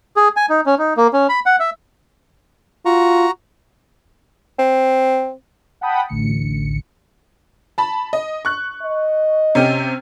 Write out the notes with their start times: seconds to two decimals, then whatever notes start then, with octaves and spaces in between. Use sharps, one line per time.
0.16 G#4
0.36 G#5
0.49 D#4
0.66 C#4
0.79 D#4
0.97 A#3
1.13 C#4
1.29 B5
1.46 F#5
1.60 E5
2.86 F4 F#4 A#5 C#6
4.59 C4
5.81 F#5 G5 A5 B5 D#6
6.09 A1 D2 C#7
7.78 A5 B5
8.13 D#5
8.45 C#6 F#6
8.83 D#5
9.55 C3 C#4 G4